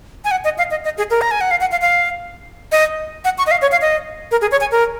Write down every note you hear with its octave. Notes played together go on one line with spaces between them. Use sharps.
G#5
F#5
D#5
F5
D#5
D#5
G#4
A#4
A#5
G#5
F#5
F5
F#5
F5
F5
D#5
F#5
C#6
D#5
F5
C#5
F5
D#5
A#4
G#4
C#5
G#5
A#4